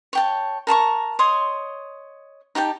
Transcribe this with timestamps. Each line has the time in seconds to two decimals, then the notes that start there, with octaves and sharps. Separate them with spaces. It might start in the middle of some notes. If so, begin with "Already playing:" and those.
0.13 C#5 G5 A5
0.67 A#4 A5 A#5 C#6
1.19 C#5 D#5 C6 D#6
2.55 D#4 G4 G5 A5